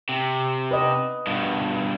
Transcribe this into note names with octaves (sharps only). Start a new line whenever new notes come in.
C3
B4 D5 D#5
G2 B2